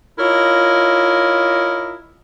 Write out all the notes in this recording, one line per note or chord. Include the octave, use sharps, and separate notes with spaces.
E4 F4 A#4 C#5 D#5